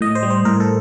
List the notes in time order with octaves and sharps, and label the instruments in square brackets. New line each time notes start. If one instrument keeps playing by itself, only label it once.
[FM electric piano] A2 D#5
C5
G3
C5
A2 A#4
A4